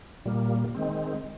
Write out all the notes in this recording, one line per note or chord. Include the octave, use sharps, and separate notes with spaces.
A#2 G3 A#3
D#3 G#3 C4